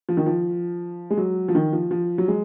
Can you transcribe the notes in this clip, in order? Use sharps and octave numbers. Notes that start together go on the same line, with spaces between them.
F3
D#3
F3
G#3
F#3
F3
D#3
F3
F3
F#3
G#3